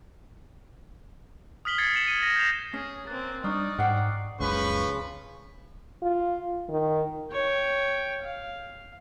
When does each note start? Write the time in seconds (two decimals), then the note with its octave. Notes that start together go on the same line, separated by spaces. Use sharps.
1.65 D#6 F6 B6 F#7 G7
1.78 G#6 A6 C7 C#7
1.95 C#7 E7 F#7
2.08 D#7
2.23 A#6
2.36 G6 A#6 C7 E7 F7
2.73 C#4 G#4
3.07 A#3 C4 F#6 A6
3.44 G3 D4 D#4 D5 C#6 D#6 F6
3.79 G#2 F#5 G5 D6 F#6 C7
4.40 F#1 C#2 C#3 F3 B4 B5 C#6
6.03 F4
6.69 D#3
7.31 C#5 G5
8.22 F5